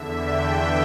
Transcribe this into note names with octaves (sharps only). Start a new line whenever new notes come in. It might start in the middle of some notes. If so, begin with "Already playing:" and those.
Already playing: E2 D3 E5
G5